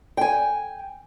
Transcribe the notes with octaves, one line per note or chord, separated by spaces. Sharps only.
G5 G#5